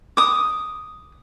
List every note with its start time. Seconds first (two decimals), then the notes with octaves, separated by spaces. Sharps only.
0.17 D6 D#6